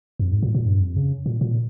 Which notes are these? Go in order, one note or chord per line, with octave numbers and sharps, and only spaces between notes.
F2
G#2
A#2
A#2
G2
F2
C#3
A#2
A#2